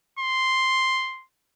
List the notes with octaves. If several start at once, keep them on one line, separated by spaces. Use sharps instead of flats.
C6